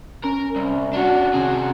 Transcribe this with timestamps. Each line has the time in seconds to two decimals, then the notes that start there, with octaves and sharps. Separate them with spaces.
0.24 C#4 A#4
0.56 C2
0.93 C#4 D4 F#4
1.33 C3 C#4 G#4